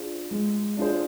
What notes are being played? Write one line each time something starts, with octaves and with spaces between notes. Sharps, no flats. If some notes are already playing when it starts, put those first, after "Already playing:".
Already playing: D4 F4 G#4 C5
G#3
D4 F4 G#4 C5